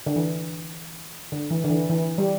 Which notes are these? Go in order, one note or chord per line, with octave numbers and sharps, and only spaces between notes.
D3
E3
D3
E3
D3
E3
E3
G3